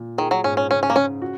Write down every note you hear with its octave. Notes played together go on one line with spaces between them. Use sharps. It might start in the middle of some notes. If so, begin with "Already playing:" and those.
Already playing: A#2
D#3 G#4
F#3
G#2 C#4
C#4
C#3 C#4
C#4
A#3
C#3 C#4
F#4